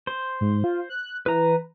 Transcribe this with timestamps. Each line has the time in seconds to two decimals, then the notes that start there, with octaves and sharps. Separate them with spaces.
0.07 C5
0.41 G#2
0.64 F4
0.90 F#6
1.26 E3 B4 A#5